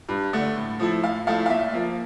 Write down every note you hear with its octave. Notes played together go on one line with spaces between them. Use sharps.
G2
D3 A3
A2
F3 A3 E4
A2 F5
F3 A3 E4 F5
F5
A#2 E5
F3 A#3